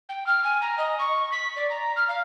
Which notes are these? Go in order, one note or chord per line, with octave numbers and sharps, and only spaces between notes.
G5
F6
G#5
A#5
D#5
C#6
B6
D5
A#5
F6
F5